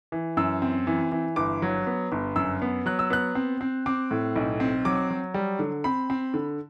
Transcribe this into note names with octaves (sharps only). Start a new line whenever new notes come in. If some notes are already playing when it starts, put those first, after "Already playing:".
E3
F#2 E6
C4
E3
E3
G1 D6
F#3
B3
G1
F#2 E6
B3
F#3 F#6
E6
B3 F#6
C4
C4
C4 D6
A2
B1
C4
F#3 D6
F#3
G3
D3
C4 B5
C4
D3